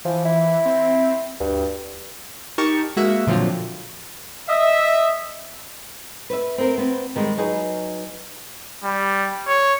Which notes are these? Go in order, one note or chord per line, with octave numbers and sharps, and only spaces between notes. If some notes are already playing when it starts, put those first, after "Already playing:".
E3 F3
E4
C4
D2 G2
D#4 G4 A#4 A5 C#6
G#3 A#3 F#4 E5
A#2 D3 F3 F#3 C4 F4
D#5 E5
B4 C5 E5
C4 A#4 C5
B3 C4
D#3 G3 G#3
F#3 D#4 G#4 B4
G3
C#5